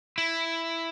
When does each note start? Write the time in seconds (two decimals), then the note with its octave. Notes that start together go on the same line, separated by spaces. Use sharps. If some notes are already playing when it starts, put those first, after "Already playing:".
0.18 E4